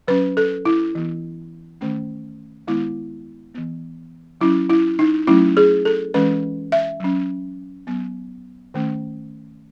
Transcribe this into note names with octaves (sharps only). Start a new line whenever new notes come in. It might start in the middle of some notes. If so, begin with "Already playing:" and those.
F#3 C#4 B4
A4
E4
E3 B3
D#3 A3 C#4
D#3 G#3 B3 E4
E3 B3
F#3 C#4 E4
E4
D#4
F#3 A3 C#4 E4
G#4
A4
E3 G#3 C#4 B4
E5
F#3 C#4
F#3 B3
D#3 A3 C#4